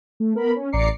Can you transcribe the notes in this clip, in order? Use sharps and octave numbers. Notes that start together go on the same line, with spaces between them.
A3
B3 A#4 B5
C#4
A1 D5 A#5 D6 C7 C#7